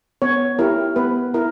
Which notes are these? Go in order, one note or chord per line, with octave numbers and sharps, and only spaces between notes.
B3 C#5
E4 G4 A#4
B3 B4
E4 A#4